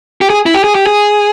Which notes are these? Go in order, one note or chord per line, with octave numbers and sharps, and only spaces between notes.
G4
G#4
E4
G4
G#4
G4
G#4